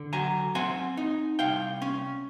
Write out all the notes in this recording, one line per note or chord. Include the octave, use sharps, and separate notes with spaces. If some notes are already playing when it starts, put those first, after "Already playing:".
Already playing: D3
F#3 G#5 A#5
C4 F#5 G#5
D#4
C2 F5 G5
C#4